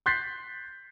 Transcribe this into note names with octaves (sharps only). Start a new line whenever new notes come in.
C6 F#6 G6 A6 B6 C7